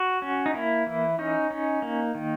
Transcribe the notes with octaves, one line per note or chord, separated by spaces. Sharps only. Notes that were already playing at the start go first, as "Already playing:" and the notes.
Already playing: F#4
C#4
D#4
A#3 E4
E3
C#4 D#4
C#4
A#3
D#3